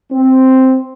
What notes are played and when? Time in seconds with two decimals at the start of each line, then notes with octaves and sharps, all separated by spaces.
0.12 C4